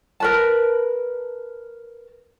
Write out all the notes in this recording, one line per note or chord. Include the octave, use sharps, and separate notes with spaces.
A#4 B4 A5